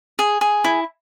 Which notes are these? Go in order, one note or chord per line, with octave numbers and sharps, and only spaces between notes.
G#4
G#4
E4